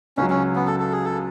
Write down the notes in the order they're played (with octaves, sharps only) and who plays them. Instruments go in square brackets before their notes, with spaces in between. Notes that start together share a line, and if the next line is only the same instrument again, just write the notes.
[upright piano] C#2 C#3 F#3 [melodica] C#4
[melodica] C#4
B3
A4
A4
G#4
A4